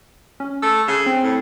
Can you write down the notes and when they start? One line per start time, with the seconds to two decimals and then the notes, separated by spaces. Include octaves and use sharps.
0.40 C#4
0.62 A3 E6
0.88 C#3
1.06 C4
1.23 A2